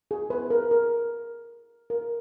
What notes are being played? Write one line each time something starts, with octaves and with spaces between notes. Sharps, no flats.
G#4
B4
A#4
A#4
A#4